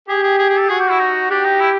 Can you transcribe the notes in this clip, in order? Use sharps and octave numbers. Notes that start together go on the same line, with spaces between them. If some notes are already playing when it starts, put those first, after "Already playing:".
G4 G#4
G#4
G#4
G#4
A4
F#4 G#4
G4
E4
D#4
D4 G4
D#4
E4